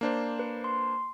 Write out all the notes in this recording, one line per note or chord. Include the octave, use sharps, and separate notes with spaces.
A#3 D4 C5
B4
C6